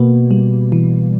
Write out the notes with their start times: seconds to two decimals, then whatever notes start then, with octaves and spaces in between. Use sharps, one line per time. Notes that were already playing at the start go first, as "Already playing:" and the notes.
Already playing: B2 A#3
0.31 G3
0.72 E3